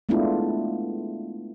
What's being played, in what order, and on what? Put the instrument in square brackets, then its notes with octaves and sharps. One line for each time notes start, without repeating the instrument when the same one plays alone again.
[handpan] G#3 A3 B3 D4 E4 F4